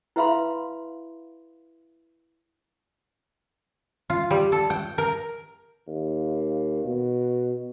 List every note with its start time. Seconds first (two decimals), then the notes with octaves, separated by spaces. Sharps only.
0.16 E4 B4 E5 F5 B5 C6
4.10 F4
4.30 G3
4.52 A4
4.70 G5
4.98 A#4
5.87 D#2
6.84 B2